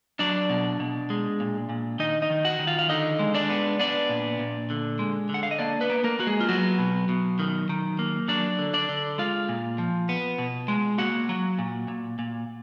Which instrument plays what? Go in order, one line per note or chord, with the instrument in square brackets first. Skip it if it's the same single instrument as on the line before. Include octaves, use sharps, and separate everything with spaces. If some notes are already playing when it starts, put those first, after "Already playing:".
[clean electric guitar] F#3 D4 D5
B2
B2
G#3
A#2
A#2
D#3 D#4 D#5
D#4 D#5
D#3
F#4 F#5
D#3
F4 F5
F5
D3 D#4 D#5
G#3
D4 D5
B3
B3 D4 D5
A#2
A#2
D3
G#3
D3
F#5
F5
D#5
A#3 D4 D5
B3 B4
A#3
A#3 A#4
A#3 F#4
G#3 G#4
F4
F#3 B3 F#4
B2
B2
D#3
D#3
A#3
F#3 D4 D5
D3
D4 D5
D3
G#3 F4 F5
A#2
F3
B3
B2
G#3
A#3 F#4 F#5
F#3
A#2
A#2
A#2